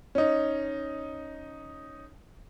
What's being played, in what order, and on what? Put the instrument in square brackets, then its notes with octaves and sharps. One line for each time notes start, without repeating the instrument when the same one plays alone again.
[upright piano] C#4 D#4